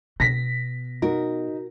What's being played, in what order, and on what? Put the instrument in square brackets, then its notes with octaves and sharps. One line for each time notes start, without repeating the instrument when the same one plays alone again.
[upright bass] B2 [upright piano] A#6 B6
[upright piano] D#4 [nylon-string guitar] F#4 A#4